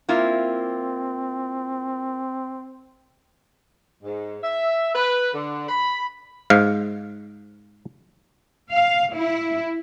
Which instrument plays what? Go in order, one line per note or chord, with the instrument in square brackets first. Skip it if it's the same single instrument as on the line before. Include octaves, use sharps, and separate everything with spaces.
[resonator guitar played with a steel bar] A#3 E4 F4 [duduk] C4
[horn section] G#2
E5
B4
D3
B5
[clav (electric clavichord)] G#2 F5
[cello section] F5
E4